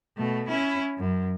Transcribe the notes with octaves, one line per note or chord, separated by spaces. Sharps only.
B2 A3
C#4 E4
F#2